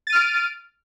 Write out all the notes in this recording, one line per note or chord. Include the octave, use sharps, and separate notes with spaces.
F6 A6 D7 D#7